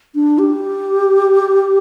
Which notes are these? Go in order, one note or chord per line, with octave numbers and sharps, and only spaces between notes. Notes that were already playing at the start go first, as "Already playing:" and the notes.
D4
G4